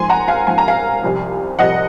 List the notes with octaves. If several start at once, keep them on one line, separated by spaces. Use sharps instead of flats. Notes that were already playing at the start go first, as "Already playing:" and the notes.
Already playing: G#2 F3 G#5 C6
F#5 A#5
F5 G#5
G#2 F3 G#5
A#5
F5 G#5
C2 C3 F3
C2 C3 F3 D#5 F#5